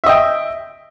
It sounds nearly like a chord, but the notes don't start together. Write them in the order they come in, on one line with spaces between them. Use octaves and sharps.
E5 D#5 G5